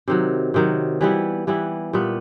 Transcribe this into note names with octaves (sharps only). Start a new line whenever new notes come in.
C3 D#3 F#3
C3 D#3 F#3
E3 G3 B3 E4
E3 G3 B3 E4
A#2 G3 B3